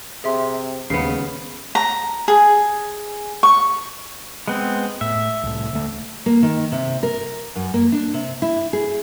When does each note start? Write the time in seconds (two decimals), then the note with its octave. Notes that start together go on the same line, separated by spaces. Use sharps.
0.24 C3 G#4 E5 C6
0.90 D#2 G#2 C#3 B3 C7
1.75 A#5
2.28 G#4
3.43 C#6
4.48 G#3 B3 C4
5.01 A2 E5
5.43 C2 A2
5.73 D2 A3
6.26 A#3
6.42 D#3
6.72 C3
7.03 A#4
7.55 F#2
7.74 A#3
7.92 D4
8.14 C3
8.42 E4
8.73 G#4